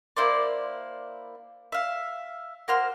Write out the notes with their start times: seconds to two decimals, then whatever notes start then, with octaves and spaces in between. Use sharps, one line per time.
0.17 A#3 E4 C5 D5
1.72 E5 F5
2.68 A#3 F#4 C5 F6